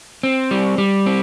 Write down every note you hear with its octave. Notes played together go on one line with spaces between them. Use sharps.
C4
G3
G3
C4